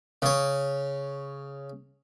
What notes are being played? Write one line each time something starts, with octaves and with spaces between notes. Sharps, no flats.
C#3 C#5